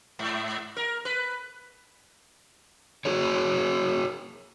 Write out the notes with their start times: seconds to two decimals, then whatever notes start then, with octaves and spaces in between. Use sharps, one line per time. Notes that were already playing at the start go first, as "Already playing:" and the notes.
0.19 G#2
0.77 A#4
1.05 B4
3.05 F#4 G#4 A#4 C#5